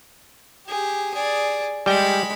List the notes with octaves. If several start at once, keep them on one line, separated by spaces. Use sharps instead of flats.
G4 G#4
G#4 D5
G3 G#3 G5 B5